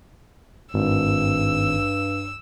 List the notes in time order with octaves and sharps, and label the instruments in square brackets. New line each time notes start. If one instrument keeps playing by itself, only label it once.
[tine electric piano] G#1 [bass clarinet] G2 [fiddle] E6